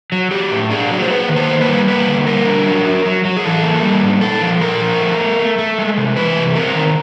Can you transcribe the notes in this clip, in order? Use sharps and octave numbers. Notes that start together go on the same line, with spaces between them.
F#3
F#3 G4
A2
D4 G#4
F#3
C5
A#3 B4
D#3
C5
A#3
B4
G3
A#3 B4
D3
G3 A#4
D4
F#3
F#3
F#3
F#3
G#4
E3 A4
A#3
G3
G#2
A#2 A4
F3
A#2 A#4
F3
A3
A3
A3
A3
G#3
C3
E3 B4
C3
C4 A#4
D#3